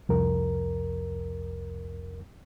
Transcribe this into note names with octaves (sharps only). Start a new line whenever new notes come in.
C2 F2 A#4